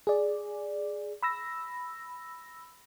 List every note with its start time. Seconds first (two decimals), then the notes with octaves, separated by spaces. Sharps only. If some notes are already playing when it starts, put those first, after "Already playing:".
0.07 G#4 D5
1.23 B5 E6 A#6